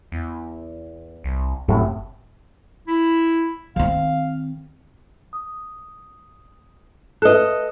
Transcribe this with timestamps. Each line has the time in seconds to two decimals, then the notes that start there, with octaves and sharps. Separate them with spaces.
0.12 E2
1.24 C2
1.68 G1 F#2 A2 C3
2.88 E4
3.76 D#3 C4 F5
5.33 D#6
7.22 A4 B4 D#5 F#6